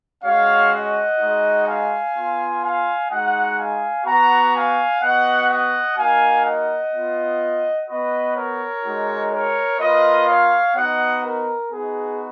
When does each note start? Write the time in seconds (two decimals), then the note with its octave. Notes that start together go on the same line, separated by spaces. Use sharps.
0.24 G#3 C#4 F#4 C#5 F5
0.72 D#5 F#5
1.19 G#3 D#4 F#4
1.67 F5 G#5
2.15 B3 F4
2.63 F5 G#5
3.10 G#3 D#4 F#4 D#5 F#5
3.58 F5 G#5
4.06 B3 F#4 F#5 A#5
4.54 F5 G#5
5.02 B3 F#4 D#5 F#5
5.49 D#5 F#5
5.97 A#3 D#4 F#4 F5 G#5
6.45 D#5 F#5
6.93 B3 F4
7.88 B3 F#4 B4 D#5
8.36 A#4 C#5
8.84 G#3 D#4 F#4
9.32 A#4 C#5
9.79 A#3 F4 B4 D#5
10.27 C#5 F5
10.75 B3 D#4 F#4 D#5 F#5
11.23 A#4
11.70 B3 D#4 F#4 G#4